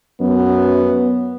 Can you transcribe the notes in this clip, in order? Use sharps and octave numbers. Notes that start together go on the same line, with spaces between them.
F#2 B3